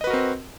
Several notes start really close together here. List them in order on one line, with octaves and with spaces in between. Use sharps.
D#5 B4 F#4 A#4 C4